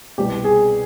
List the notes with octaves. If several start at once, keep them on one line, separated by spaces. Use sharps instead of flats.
C2 B2 G4
G#4